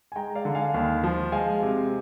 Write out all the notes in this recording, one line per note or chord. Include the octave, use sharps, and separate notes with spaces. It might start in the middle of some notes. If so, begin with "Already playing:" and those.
G#5
G#3 G5 A#5
D5 F5
D3
F5 G#5
D#2
F3
G#3 F5 G#5
C3